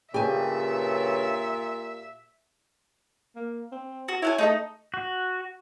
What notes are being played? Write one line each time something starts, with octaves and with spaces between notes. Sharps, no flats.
G2 A#2 C#3 G4 E5 G#5
A#3
C4
F#4
E4 C#5 F#5 G#5
A3 D#4 A4 D#5
F#4